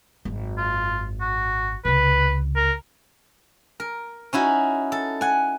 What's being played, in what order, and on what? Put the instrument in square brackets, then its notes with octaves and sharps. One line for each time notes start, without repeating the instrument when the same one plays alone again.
[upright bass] G#1 F#2
[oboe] F4
F#4
[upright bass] C#2 C3 [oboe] B4
[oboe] A#4
[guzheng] A#4
C#4 D#4 E4 F#4
A4
F#5 G#5